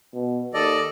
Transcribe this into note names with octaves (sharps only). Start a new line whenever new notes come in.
B2
D#2 A4 D5 D#5